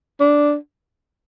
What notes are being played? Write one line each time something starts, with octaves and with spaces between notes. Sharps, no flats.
D4